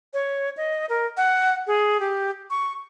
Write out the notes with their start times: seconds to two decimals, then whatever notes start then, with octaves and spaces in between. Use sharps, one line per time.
0.14 C#5
0.57 D#5
0.89 A#4
1.17 F#5
1.67 G#4
2.00 G4
2.50 C#6